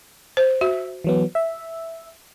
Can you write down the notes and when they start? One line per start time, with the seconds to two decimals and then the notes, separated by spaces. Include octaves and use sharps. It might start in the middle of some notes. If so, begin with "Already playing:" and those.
0.37 C5
0.61 F#4 E5
1.04 E3 F#3 B3
1.35 E5